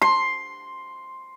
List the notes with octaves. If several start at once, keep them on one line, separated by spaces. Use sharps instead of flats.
C6